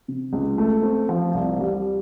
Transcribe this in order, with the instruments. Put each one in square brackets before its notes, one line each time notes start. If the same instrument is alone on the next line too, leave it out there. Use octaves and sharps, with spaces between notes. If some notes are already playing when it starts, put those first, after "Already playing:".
[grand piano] C3
C#2
A3
C4
F3
C2
G3